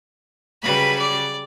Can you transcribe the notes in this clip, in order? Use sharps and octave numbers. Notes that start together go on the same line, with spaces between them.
C#3 F#3 G3 B4 B5
D5